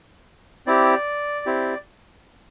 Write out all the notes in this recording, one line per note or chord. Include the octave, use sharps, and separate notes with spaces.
C4 E4 G4 D5
C4 E4 G4